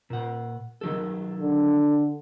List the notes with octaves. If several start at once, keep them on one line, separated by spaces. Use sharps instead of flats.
A#2 F#5
D#3 F#3 A4
D3